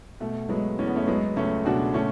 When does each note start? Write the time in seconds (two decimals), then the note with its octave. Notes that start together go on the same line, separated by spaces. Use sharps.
0.20 B2 A3
0.49 F#3 G#3 B3
0.79 E2 C#4
0.87 B3
0.96 A3 C#4
1.07 F#3 G#3 B3
1.36 C#2 A3 C#4
1.65 B2 D4 F#4
1.94 D3 A3 C#4